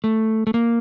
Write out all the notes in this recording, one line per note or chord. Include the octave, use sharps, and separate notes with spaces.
A3
A3
A#3